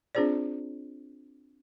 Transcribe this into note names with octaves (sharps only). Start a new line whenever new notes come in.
C4 D4 F4 G#4 C5 D5